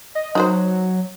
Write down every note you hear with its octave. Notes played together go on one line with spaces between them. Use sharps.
D#5
F#3 D#4 F#4 C5